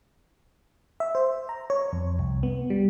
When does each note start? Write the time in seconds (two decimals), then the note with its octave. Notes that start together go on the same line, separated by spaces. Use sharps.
1.00 E5
1.15 C5
1.49 A#5
1.70 C#5
1.92 F2
2.19 C2
2.43 B3
2.70 G3